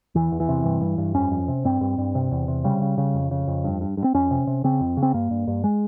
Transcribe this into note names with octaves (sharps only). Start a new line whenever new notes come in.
E2 E3
E2
E3
C3
G2
G2
G2
F2 C#4
F2
C3
G2 C4
G2
G2
C3
E2
C3
C#3 G3
C#3
C#3
F2
C#3
F2
G2
G2
G2
C4
F2 C#4
C3
C3
C#3 C4
F2
C#3
C4
G2 A#3
G2
G2
G#3